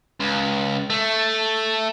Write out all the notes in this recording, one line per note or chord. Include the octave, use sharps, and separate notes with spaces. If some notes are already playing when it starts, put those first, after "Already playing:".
C#2
A3